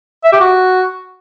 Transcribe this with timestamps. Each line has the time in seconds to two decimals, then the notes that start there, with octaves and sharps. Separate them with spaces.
0.24 E5
0.33 G4
0.41 F#4